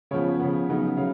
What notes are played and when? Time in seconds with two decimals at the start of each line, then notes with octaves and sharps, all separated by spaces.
0.11 C#3 F3 B3 C#5
0.40 C#3 F3 B3
0.69 C#3 F#3 B3 D#4
0.97 C#3 F#3 F5